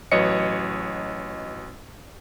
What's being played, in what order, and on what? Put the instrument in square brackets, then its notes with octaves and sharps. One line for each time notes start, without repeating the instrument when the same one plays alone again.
[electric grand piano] A1 F#3 B4 C#5 D#5 C#7